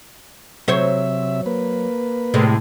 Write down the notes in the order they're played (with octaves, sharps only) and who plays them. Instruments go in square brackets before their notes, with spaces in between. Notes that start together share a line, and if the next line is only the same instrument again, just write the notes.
[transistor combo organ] C3 E5 [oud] F#3 C5 C#5
[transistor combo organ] A#3 B4
[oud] A2 C3 G#3